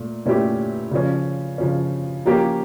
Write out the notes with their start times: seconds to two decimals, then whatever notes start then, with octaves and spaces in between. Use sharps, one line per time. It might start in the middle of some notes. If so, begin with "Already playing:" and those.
Already playing: A#2 A3
0.26 A#2 A3 C#4 E4 G4
0.91 C#3 F3 C#4
1.58 C#3 F3 C#4
2.25 F3 A#3 C#4 G4